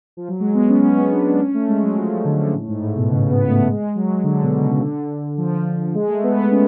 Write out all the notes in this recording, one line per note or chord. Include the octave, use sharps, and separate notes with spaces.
F3
F#3
G#3
B3
C#4
C#4
B3
D4
D4
C#4
A3
G#3
F#3
F3
D3
A2
G#2
A2
B2
C#3
B3
A3
A3
G#3
F#3
D3
B2
C#3
D3
F3
G#3
A3
B3
C#4